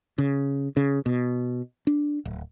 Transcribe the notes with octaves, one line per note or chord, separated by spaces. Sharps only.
C#3
C#3
B2
D4
D1